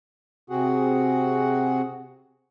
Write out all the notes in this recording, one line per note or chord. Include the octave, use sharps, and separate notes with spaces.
C3 C4 F#4 G#4 F#5